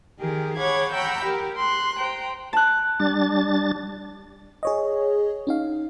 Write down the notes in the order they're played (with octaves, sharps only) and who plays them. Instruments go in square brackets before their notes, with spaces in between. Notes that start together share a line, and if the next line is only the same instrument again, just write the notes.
[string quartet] D#3 G4 G#4 A#4
G#4 C#5 F#5 B5 D6 G#6
F#5 G5 A#5 B5 E6 G6
G4 A#4
C6 F#6
C5 G5 A#5
[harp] A5 F#6
[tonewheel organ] G3 D4 A6
[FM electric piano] G#4 C#5 D#5
C#4 D#4 F5